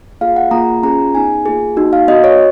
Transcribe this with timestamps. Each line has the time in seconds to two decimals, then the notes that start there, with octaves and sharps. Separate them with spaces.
0.21 A#3 F4 G#4 F5
0.36 F#5
0.51 A#3 F4 G#4 A#5
0.83 C#4 F4 G#4 A#5
1.14 B3 D#4 G#4 G#5
1.46 A#3 F4 G#4
1.77 A#3 D#4 F#4
1.93 F5
2.08 B3 F#4 D#5
2.24 C#5